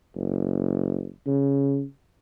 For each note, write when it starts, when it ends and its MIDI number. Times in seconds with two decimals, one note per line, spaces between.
0.16 1.08 30
1.27 1.84 49